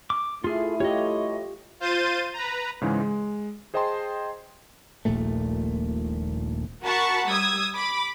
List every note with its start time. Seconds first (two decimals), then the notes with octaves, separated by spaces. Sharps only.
0.10 D6
0.44 A3 E4 F4 G#4
0.80 F4 G4 C#5 D#5
1.80 F4 C5 G6 A6 D#7
2.33 B4 A#5
2.81 G#2 C#3 E3 G#3
3.00 G#3
3.74 G#4 C5 D#5 G5 A5 C6
5.05 D#1 A#1 A#2 A3
6.83 F#4 A#4 F#5 A5 B5 C#6
7.28 G3 D#6 E6 G#6
7.75 B5 D6